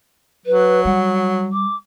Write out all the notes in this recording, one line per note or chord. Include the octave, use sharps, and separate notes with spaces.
F#3 B4
G3 F#5
D6